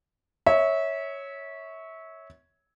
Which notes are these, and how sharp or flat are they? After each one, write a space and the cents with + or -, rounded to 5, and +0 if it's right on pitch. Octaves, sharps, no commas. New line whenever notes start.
C#5 +0 E5 -25